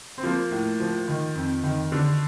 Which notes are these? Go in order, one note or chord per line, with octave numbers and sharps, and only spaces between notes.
C4
F3 A#3
A2
F3
D#3
F2
D#3
D3